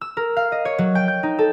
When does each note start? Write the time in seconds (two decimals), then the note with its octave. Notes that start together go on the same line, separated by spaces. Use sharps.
0.01 E6
0.17 A#4
0.36 F5
0.52 D#5
0.65 C#5
0.78 F#3
0.95 G5
1.08 G6
1.23 D#4
1.39 A4